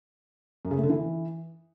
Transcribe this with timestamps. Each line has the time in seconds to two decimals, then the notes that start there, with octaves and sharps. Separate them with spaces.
0.65 F#2
0.71 C#3
0.77 A3
0.83 D3
0.90 E3